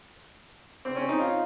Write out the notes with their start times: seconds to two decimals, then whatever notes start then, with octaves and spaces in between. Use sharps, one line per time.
0.85 C4
0.96 C#4
1.09 D#4
1.20 F4